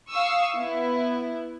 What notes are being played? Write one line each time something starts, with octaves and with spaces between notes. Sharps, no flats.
F5 C#6 D#6 E6
B3 E4